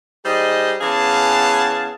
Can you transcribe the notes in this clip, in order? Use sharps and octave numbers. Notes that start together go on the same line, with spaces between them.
G3 D#4 G#4 C5 D#5
E3 B3 C#4 G#4 F5 A5